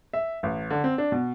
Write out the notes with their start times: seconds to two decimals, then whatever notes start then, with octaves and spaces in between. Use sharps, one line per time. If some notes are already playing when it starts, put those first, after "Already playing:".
0.13 E5
0.43 A1
0.70 D3
0.84 C4
0.98 D4
1.12 B2